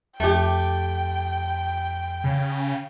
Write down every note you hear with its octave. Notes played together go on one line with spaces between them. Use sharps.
F2 A3 G4 G5
C#3